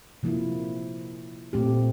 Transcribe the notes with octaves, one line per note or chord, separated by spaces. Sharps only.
C3 F3 A#3 E4
A#2 A3 C4 G4